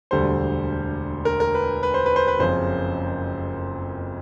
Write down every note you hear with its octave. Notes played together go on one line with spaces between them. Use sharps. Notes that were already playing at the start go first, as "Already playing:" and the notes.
E1 D2 D3 G3 C5
A#4
A#4
B4
B4
C5
B4
C5
B4
F#1 F2 C#3 C5